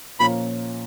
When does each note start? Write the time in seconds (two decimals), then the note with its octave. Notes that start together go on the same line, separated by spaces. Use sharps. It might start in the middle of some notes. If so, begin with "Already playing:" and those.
0.20 A#2 F3 A#3 C#4 B5